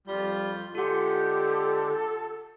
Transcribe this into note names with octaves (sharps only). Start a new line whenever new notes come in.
F2 G3 F4 G6
D3 G#3 F4 G4 A4 F#5